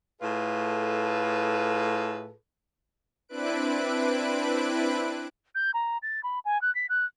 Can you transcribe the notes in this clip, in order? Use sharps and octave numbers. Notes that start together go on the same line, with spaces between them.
A2 F4 G#4 A4 B4
C4 D4 E4 B4 F#6 D7
G6
A#5
A6
B5
G#5
F#6
B6
F#6